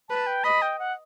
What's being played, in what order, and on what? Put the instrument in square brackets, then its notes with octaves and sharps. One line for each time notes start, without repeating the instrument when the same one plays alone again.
[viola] B4 [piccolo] A5
[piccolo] G5
[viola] D#5 [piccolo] B5
[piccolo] G5
F#5